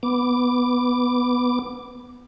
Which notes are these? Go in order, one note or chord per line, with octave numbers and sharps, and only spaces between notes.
B3 D6